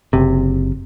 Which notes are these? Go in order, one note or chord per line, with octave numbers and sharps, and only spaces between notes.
F#1 C3